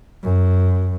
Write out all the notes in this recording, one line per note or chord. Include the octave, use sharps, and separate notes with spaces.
F#2